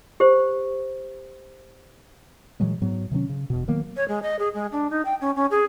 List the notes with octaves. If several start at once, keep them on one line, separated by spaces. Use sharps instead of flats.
G4 C5
A#2 E3 F#3 G#3
G#2 F#3 B3
C3 D#3 F#3 C#4
C#3
E1 B2
D#3 F#3 A#3 B3
C#5
G#3
D#5
G#4
G#3
D4
D#4
G5
C#4
C#4
G#4